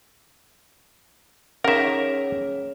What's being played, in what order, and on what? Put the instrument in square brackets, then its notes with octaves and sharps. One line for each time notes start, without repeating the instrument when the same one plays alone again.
[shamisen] D#3 F#5 [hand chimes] C#4 G#4 C#5 [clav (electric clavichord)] A#4 E5